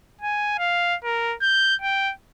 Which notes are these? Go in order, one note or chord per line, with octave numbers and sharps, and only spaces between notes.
G#5
F5
A#4
G6
G5